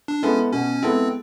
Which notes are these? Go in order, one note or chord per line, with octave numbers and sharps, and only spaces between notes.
D4
G#3 B3 C#4 E4 A4
B2 C#4
G#3 B3 C4 E4 A4